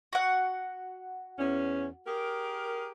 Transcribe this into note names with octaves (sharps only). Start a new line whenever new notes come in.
F#4 F#5
E2 C#4
G4 G#4 A#4